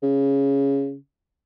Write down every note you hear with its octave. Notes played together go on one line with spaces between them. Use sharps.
C#3